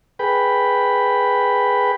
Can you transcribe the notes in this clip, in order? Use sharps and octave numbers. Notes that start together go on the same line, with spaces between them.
G#4 B4 G5 B5